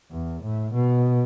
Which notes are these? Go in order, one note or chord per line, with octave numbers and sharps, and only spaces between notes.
E2
A2
B2